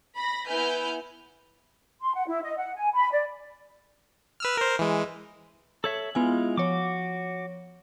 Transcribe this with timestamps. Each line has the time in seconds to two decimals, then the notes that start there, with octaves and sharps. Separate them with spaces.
0.17 B5 A#6
0.49 B3 E4 B4 G#5 F6 G6
2.01 C6
2.16 F#5
2.27 E4
2.43 D#5
2.57 F#5
2.75 G#5
2.93 B5
3.12 D5
4.40 B4 E6 F6
4.57 A#4 C5
4.79 E3 G#3
5.84 A4 C#5 E5 F#7
6.15 G#3 B3 E4 F4 G#5
6.57 F3 F#4 C#5 D6